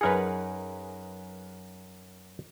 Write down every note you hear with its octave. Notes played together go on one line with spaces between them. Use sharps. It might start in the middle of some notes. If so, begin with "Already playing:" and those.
F#2 D#4 G#4 A#4 B4 F#5